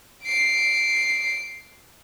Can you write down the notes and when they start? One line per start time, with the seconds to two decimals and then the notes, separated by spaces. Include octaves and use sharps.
0.23 C7 D7